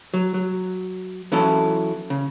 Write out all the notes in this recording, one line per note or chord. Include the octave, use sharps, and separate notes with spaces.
F#3
F#3
E3 F#3 C#4 E4 A4
C#3